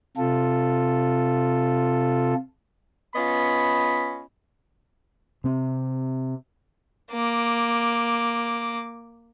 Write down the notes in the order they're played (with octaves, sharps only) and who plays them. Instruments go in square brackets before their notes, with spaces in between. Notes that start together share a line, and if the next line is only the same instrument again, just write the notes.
[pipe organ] C3 F4 A4
[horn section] B3 C#4 F4 D#5 B5
[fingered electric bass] C3 C4
[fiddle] A#3 D6